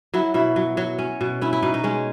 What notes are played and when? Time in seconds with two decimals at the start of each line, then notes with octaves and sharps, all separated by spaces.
0.14 F#3 E4
0.34 B2 E4
0.56 F#3
0.77 F#3
0.99 C#4
1.21 B2
1.41 C#4 E4
1.53 E4
1.63 B2 D#4
1.74 D#4
1.84 G#3 C#4